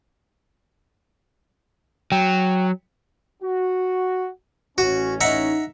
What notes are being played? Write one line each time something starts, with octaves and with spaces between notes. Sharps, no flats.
F#3 G5
F#4
A1 C#4 F#4
D#4 E5 F#5 A#5